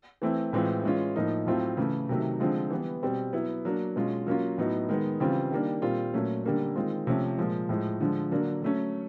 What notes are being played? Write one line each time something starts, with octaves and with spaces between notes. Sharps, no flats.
E3 A3 C4 E4
A2 E3 G#3 C4 F4
E3 G#3 C#4 F4
A2 F3 A#3 D#4
A2 F#3 A3 C4 F4
C#3 E3 A3
C3 D#3 F#3 A3
D3 F3 G#3 C4 F4
E3 G3 B3
B2 G3 C4
F#3 B3 E4
F#3 A#3 D4
B2 G#3 C#4 F4
F#3 A#3 C#4 F4
A2 F#3 B3 D#4
D#3 G#3 B3
C#3 E3 G3 C4 F4
D#3 G3 A#3 D4
A#2 G3 C4 F4
A#2 F#3 A3 C#4
D3 G3 A#3 C#4
D#3 G#3 C4 F4
C3 F3 A3 C#4
A#2 F3 G#3
A2 F3 G#3
D3 F3 G#3
D3 F#3 A#3 D4
F#3 A3 C#4